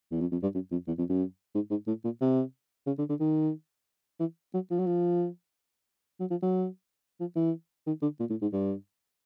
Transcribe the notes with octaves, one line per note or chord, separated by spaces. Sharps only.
E2
F2
F2
G2
F#2
F2
E2
F2
F#2
G#2
G#2
A2
A#2
C3
C#3
D3
D3
D#3
E3
F#3
F3
F#3
F3
F#3
F3
F#3
F3
E3
D#3
D3
A#2
A2
G#2
G2